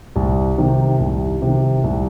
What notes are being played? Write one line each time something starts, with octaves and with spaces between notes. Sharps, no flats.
C2
C3 D#3
C2
C3 D#3
C2